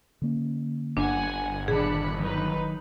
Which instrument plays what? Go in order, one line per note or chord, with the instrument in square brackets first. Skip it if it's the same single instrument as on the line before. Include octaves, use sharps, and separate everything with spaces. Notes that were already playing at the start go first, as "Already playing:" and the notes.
[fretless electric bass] D3 A#3 C#4
[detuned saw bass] G1 [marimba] D4 [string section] F#5 G#5
[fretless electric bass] A#2 D#3 [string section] D4 B5 C#7 [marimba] G#4
[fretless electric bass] D#3 F#3 [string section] D#4 B4